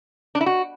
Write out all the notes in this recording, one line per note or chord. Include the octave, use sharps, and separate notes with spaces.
D4
E4
F#4